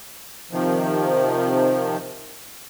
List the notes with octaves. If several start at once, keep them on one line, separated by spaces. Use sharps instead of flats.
C3 D#3 F3